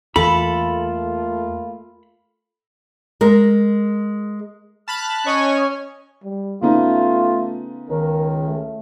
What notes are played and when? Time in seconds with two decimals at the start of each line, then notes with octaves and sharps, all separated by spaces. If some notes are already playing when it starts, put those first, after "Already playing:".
0.16 E2 A3 A#3 F4 A4 B5
3.21 G#3 A#4
4.88 A5 B5 F6 F#6
5.26 C#4 C#5 D#5 G#5 C#6
6.24 G3
6.62 C#3 A3 B3 D#4 F4
7.89 C#2 D#3 A#4
8.46 A3